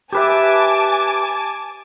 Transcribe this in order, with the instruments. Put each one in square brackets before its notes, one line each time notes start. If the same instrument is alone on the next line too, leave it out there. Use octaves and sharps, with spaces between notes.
[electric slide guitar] G4 B4 E5 [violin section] G#5 A5 D6